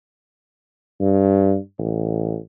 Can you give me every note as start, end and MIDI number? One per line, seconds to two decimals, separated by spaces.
1.00 1.57 43
1.79 2.37 33